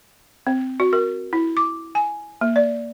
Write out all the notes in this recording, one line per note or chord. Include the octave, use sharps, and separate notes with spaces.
C4
F#4
A#4
E4
D6
G#5
A#3
D5